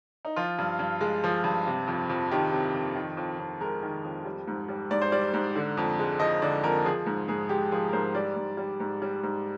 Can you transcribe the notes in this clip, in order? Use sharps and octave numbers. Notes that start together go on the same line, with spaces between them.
D#4
F3 F4
G2
G2
G#3
F3
G2
C3
F2
F2
D#3 G4
C3
F2
D#3
F2
F2
G#3 A#4
D#3
F2
G3
G#2
G3
G#2 D5
C5
G3 D5
G#2
D3
F2
G#3
F3 D#5
D3 D5
F2 A#4
F3 G#4
G#2
G#2 G#4
G#3 G4
F3 G#4
A#4
G#2 C5
G3 D5
G#2
G3
G#2
G3
G#2